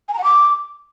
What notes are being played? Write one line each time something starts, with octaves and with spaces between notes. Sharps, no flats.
G#5
A#5
F#5
D6